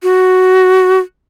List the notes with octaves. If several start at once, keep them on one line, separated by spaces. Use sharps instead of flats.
F#4